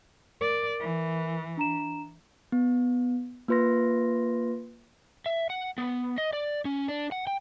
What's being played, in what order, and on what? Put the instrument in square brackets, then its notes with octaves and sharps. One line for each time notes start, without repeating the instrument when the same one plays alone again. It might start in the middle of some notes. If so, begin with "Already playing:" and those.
[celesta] A#4 [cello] D5
[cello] E3
[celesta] D4 A#5 E7
[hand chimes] B3
A#3 F4 B4 C6 A#6
[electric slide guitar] E5
F#5
B3
D#5
D5
C#4
D4
F#5
G5